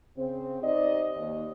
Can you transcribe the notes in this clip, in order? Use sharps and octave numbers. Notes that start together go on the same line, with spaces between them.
C#3 C4
D#4 G4 C5 D5 D#5
D#2